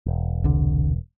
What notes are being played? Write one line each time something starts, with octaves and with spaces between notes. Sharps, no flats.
E1
C2 D3